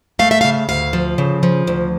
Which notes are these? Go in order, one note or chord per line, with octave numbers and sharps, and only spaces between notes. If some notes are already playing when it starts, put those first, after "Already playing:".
A3 F5
E5
C#3 F5
D2 F5
F3
C#3
F3
D2